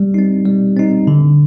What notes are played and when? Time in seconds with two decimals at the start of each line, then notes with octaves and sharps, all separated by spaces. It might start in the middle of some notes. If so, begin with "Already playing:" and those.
Already playing: G3
0.14 C4 D#4
0.45 G3
0.77 C4 D#4
1.07 D3